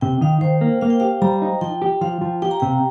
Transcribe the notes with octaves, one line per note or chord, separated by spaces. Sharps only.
C3 G5
D#3 F5
D#3 C5
A#3
A#3 F5
G5
G4 F5
G3 A#5
D#4
F3 G5
G4
F3 F5
F3
G4 G5
A#5
C3 G5